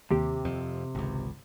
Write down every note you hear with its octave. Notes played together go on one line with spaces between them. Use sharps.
D#2 C3 G4
F2
G#1 C#2